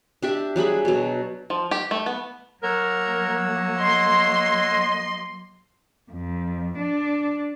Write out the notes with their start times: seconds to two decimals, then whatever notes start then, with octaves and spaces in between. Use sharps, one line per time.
0.23 D4 G4 E5
0.56 F#3 G3 G#4 B5
0.85 B2 F#3
1.50 F3
1.71 G4
1.91 A3
2.06 B3
2.63 F#3 A#3 A#4 C#5 F#5 E6
3.80 D#5 C6
6.12 F2
6.78 D4